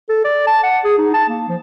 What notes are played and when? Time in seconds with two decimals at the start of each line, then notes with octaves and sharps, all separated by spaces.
0.09 A4
0.25 D5
0.47 A5
0.63 F#5
0.84 G#4
0.98 D#4
1.14 A5
1.29 A#3
1.48 F3